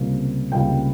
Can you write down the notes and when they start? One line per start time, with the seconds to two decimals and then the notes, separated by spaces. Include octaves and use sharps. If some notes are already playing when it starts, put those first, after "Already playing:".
Already playing: C#2 C3 G3 A#3
0.52 C#2 C3 G3 A#3 G5